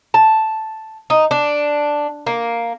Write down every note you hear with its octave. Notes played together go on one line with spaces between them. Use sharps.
A5
D#4
D4
A#3